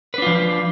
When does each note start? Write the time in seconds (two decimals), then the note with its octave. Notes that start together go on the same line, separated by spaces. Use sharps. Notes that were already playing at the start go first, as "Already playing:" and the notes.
0.14 B4
0.18 D4
0.22 F4
0.26 F3